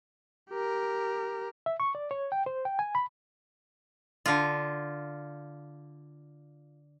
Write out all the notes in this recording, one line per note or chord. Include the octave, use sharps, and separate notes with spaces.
G4 A#4
E5
C#6
D5
C#5
G5
C5
G5
G#5
B5
D3 F4